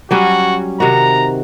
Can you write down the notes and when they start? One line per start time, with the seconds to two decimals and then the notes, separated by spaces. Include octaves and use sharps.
0.11 F#3 G3 C#4 F#4
0.80 C3 D#3 F#4 A#5